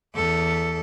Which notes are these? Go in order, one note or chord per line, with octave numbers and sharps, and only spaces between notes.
E2 A4